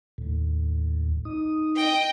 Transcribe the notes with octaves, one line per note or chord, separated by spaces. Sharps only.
D#2 A2
D#4 D#6
D#5 G5